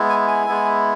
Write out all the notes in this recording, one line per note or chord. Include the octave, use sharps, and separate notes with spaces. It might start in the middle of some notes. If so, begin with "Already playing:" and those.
Already playing: G#3 B3 E4
G#5
G#5
G#3 B3 E4